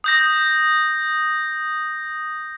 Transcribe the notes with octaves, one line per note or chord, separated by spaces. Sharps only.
D#6 G6 A#6